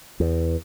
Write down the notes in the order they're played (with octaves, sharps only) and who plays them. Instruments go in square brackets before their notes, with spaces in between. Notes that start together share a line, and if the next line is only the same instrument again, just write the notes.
[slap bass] E2